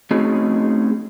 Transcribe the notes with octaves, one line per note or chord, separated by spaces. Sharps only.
A3 C4 C#4 D#4 F#4 G#4